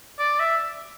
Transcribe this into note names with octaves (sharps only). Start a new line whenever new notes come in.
D5
E5